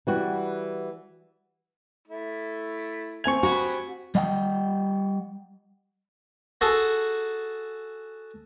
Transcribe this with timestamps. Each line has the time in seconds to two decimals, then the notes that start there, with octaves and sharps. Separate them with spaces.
0.07 E3 G3 F#4
2.08 A3 E4
3.24 C4 G#5 C#6 G#6 F7
3.43 F#4 G4 F#5 B5
4.15 G3 D#5 F#5 G5
6.61 F#4 G#4 A4